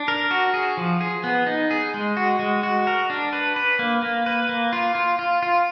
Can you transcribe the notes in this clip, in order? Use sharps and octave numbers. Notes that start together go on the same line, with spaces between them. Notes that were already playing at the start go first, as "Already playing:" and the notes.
Already playing: D4
A#4
F#4
G#4
F3
G#4
B3
D#4
G#4
G#3
F#4
G#3
F#4
A#4
D4
B4
B4
A#3
A#3
B4
A#3
F4
F4
F4
F4